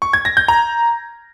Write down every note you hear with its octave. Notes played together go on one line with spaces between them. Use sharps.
C#6
G#6
A#6
G6
A#5